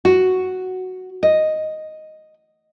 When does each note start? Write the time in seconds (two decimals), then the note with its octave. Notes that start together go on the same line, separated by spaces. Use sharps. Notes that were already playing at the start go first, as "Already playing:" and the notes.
0.05 F#4
1.23 D#5